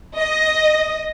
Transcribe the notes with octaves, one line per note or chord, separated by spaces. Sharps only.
D#5